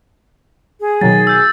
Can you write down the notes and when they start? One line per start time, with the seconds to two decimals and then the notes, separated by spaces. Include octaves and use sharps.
0.80 G#4
1.01 B2 D#3 F#3 A6
1.27 E6 G6 A6